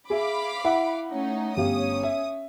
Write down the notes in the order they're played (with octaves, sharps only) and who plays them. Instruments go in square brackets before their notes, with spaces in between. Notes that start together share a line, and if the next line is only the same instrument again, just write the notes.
[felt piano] G#4 E5 [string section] F5 B5 D6
[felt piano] E4 E5 F#5
[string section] A3 C#4 D#4
[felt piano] G1 G4 F5 [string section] C#4 D#6
[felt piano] E5